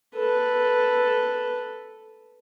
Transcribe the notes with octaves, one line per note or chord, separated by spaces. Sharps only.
A4 B4